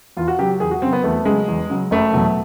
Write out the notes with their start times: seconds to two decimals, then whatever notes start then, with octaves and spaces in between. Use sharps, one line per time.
0.17 E2 F4
0.28 F#4
0.38 C#3 F#3 G4
0.60 E2 G#4
0.71 F#4
0.82 C#3 F#3 C4
0.93 B3
1.04 E2 A3
1.25 C#3 F#3 G#3
1.48 E2
1.70 C#3 F#3
1.91 F#1 A3
2.13 E2 B2 F#3